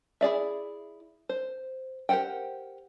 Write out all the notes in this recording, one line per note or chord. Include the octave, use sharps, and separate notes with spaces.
E4 G#4 D5 E5
C5
G4 A#4 C5 F#5 G5